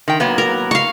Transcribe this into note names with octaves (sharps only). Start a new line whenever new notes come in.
D#3 G5
F#3 A#3 B3
A#4
F5 C#6